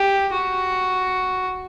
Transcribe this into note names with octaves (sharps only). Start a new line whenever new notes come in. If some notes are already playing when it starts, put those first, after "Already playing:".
Already playing: G4
F#4